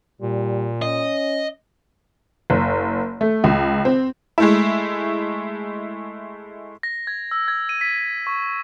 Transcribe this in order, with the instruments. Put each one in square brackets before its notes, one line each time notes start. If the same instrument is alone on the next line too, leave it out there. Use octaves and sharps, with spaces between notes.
[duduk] A#2 [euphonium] G3
[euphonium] C#4 [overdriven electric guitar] D#5
[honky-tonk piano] F#1
A3
C#2
C4
G#3 A3 E4
[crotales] A#6
G#6
E6
G#6
D#7
B6
C#6